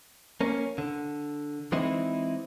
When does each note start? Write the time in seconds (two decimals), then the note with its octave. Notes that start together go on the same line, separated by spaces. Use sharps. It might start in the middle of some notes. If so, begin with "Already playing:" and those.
0.41 A#3 C#4
0.78 D3
1.72 E3 G#3 C4 D#4 E4